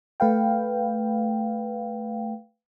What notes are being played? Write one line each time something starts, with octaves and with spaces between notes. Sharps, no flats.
A3 B4 F5 G5